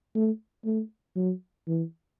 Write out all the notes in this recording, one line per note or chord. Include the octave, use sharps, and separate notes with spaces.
A3
A3
F#3
E3